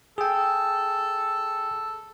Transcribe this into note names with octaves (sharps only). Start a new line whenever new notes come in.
G#4 A4 G5